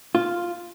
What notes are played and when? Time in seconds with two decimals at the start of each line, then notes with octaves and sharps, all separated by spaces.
0.15 F4